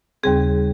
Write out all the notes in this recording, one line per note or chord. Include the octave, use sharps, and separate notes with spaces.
D#2 C#3 G3 C4 G#4